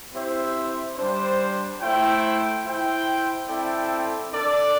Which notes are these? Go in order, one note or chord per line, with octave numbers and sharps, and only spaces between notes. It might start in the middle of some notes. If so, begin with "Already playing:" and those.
C4 E4 G4 C5 E5
G3 D4 C5
A3 E4 C5 G5
E4 C5 G5
C4 E4 A4 D5 G5
D4 A4 D5